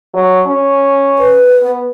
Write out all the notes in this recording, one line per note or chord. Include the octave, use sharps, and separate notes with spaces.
F#3
C#4
B4
B3